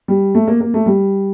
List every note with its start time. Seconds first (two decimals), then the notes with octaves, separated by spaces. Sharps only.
0.08 G3
0.35 A3
0.48 A#3
0.61 A#3
0.74 A3
0.86 G3